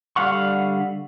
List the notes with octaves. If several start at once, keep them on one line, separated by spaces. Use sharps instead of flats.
D3 G3 F5 F#5 C#6